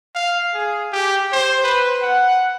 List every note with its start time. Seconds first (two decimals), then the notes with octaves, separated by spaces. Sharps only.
0.15 F5
0.54 G#4
0.92 G4
1.32 C5
1.63 B4
2.02 F#5